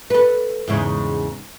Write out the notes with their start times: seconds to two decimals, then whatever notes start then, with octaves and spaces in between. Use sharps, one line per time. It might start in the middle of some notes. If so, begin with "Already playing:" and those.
0.10 A4 B4
0.68 E2 G#2 C#3